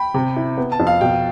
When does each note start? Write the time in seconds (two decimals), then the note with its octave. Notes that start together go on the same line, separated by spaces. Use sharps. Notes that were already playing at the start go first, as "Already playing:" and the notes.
Already playing: G5 B5
0.14 C3
0.36 E4
0.58 B3
0.72 A5
0.80 F2
0.87 F5
1.01 B2 G5